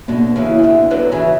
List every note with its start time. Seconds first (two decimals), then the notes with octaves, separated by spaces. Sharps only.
0.08 B2 D3 A#3
0.36 C#3 E3
0.50 E4
0.59 E3
0.63 B2 D3
0.90 D3 F#3 B4
1.12 C#3 E3